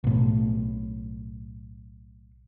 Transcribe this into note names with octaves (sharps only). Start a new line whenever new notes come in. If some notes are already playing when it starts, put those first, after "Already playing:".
B1 A2